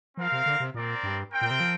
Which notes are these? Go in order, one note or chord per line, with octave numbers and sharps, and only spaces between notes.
F3 C4 A#4 F5
C3
D3
C3
A#2 C4 A#4 D5
G2
C4 A#4 G5
A#2
C3
F3